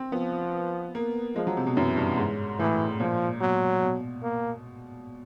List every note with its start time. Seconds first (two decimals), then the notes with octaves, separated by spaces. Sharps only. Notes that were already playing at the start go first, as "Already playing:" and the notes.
Already playing: C4
0.12 F3 B3
0.95 A#3
1.36 F3 G#3
1.47 F#3
1.57 C3
1.67 B2
1.77 F#2 E3
1.97 G2
2.18 G#2
2.59 A2 E3
3.00 A#2 F3
3.41 B2 F#3
3.82 B2
4.23 A#3